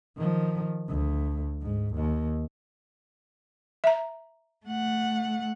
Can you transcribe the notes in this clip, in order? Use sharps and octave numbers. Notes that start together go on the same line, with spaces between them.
D#3 F3
D2
G#2
D#2
E5 A#5
A3 F#5